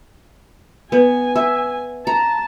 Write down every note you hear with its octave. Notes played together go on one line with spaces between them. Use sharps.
B3 G#5
E5
A5 A#5